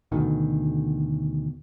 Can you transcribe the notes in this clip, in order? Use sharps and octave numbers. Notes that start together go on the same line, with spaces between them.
D2 B2 D3 D#3